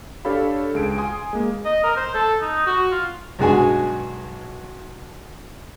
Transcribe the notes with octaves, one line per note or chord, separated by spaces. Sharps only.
D4 G4 A4 C#5 F5 B5
C#2 G#4 D7
G#5 C6 D#6
G#3 A#3
D#5
A#4
C5
A4
D#4
F#4
F4
B1 G2 G#3 F#4 G#4 G#5